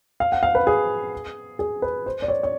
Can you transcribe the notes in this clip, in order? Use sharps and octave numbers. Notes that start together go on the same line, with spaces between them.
F5
F#5
F5
B4
G#4
G#4
B4
C5
D5
C#5
C#5